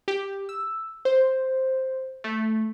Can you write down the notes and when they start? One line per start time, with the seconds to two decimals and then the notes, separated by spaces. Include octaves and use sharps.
0.08 G4
0.49 E6
1.05 C5
2.24 A3